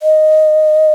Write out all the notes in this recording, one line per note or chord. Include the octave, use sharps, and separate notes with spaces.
D#5